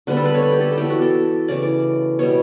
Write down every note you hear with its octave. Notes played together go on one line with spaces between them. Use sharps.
D3 G3 B3 B4
A4
B4
C#5
B4
G4
A4
A4
E3 B3 G4
F#4
A4
C#3 E3 A3 D5
D5
B2 G3 B3 C#5